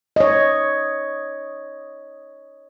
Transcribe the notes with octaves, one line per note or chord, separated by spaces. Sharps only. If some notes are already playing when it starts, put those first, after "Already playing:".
C#5 D#5